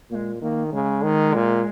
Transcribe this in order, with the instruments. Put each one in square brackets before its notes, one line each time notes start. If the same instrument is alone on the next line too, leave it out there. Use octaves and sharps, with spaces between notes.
[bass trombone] A#2 [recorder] A#3
[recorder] G#3
[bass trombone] D#3 [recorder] A#3
[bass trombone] C#3 [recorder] G#3
[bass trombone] D#3
A#2